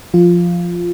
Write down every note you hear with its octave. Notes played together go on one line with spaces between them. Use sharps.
F3 F4